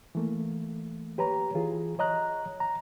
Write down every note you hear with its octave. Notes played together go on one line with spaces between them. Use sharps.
E3 A3 A#3
G4 B4 C#5 A#5
E3 F4 G#4
C#5 D#5 A#5 F#6
A#5